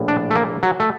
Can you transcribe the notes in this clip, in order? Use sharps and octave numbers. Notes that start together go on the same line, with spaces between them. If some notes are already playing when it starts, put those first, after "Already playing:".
Already playing: A#1 A2
D4
A3
A#3
F#3
A3